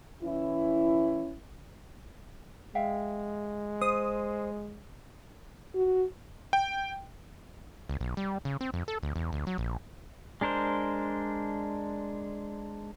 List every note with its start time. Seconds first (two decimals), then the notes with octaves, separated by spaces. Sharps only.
0.23 E3 C#4 E4
2.75 G#3 E5 F5 G5
3.81 C5 D#6
5.75 F#4
6.53 G5
7.89 C#2
8.01 B1
8.17 G3
8.45 C#3
8.61 C4
8.74 F2
8.88 A4
9.03 D2
9.16 E2
9.33 D2
9.47 F#3
9.58 A#1
10.41 G#3 D4 A#4 C5